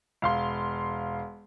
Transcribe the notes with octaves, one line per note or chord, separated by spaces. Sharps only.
E1 F5 C6